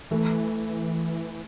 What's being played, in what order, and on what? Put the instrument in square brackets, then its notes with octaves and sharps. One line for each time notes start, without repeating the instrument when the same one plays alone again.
[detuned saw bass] E3 [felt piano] A3